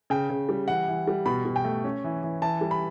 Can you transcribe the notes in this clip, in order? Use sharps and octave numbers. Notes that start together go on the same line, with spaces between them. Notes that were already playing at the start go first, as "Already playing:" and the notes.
C#3 G5
C#3
G3
E3 F#5
E3
G3
B2 B5
B2
G5
A3
C#4
E3
E3
E3 A5
G3
B5